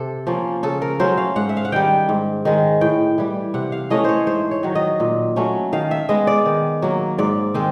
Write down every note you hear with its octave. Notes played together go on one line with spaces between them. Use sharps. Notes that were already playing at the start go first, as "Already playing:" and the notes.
Already playing: C3 A4
F3 A#3 C#4
C#3 A4
A#4
F#3 A3 C#4 C5
F5
G#2 F#5
E5
F5
F#5
D#3 G3 G5
G#2
D#3 G#3
A2 G5
E3 G3
C3 F#5
F5
E3 A3 C#4 D#5
C5 C#5
G#2 C5
C#5
D#3 F#3
D#5
A#2
F#3 A3 C#4
D#3 F5
E5
G#3 B3 D#5
D5
D#3
F#3 A#3
G#2 D5
D#3 G#3 C4